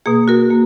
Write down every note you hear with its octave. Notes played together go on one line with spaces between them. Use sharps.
B2 A#3 G#4
F#4 A#4
A#3